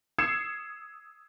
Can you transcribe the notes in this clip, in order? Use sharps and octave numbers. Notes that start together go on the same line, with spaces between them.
D#6 E6 G#6 C7 C#7 E7